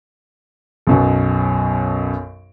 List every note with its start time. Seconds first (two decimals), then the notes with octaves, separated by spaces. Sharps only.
0.87 B1 F#2 B2